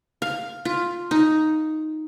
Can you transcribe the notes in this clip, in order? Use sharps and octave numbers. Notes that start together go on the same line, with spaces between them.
F5
F4
D#4